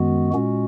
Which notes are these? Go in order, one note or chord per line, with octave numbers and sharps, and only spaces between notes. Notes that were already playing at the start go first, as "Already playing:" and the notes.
Already playing: F#2 D#3 G#3 B3 F#4
A#2 G#3 C#4 F#4